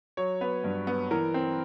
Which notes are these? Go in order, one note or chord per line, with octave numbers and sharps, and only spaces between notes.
F#3 C#5
B3 B4
G2
B3
E3 A#4
C4